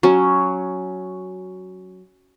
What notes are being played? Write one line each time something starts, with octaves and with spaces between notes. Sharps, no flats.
F#3 C#4